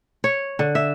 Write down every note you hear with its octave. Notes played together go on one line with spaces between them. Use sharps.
C#5
D3
E5